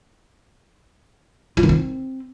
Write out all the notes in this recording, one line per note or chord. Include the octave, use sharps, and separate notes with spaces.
F4
D#3
C4